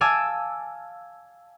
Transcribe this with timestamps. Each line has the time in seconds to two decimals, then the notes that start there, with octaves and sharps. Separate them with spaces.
0.01 F5 G#5 A5 D6 E6